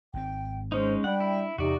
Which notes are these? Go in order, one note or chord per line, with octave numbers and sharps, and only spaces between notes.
G#1 G#2 C4 G5
G#3 C#4 D#4 C5
G3 D4 F#5 G5
E4
E2 C3 D#4 F#4 D5